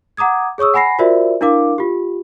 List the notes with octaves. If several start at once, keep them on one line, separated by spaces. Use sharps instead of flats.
F#5 A#5 D6 D#6 G#6
G#4 C#5 C#6 D#6 E6
F#5 G#5 B5 A#6 C7
F4 F#4 A#4 C5 D5 E5
D4 E4 A#4 F5 D6
F4 G4